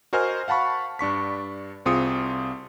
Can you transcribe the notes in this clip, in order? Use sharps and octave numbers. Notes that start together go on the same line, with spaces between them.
F#4 A#4 C5 D#5 G#5 F6
F5 F#5 A5 B5 C#6
G2 D4 C#6 B6
C2 C4 F4 G#4 D#6 C#7